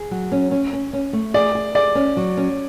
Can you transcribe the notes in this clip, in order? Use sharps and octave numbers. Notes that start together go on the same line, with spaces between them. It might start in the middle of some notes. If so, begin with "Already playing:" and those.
Already playing: G#4
F#3
C#4
C#4
C#4
C#4
A3
G#4 D5
G#4
G#4 D5
C#4
F#3
C#4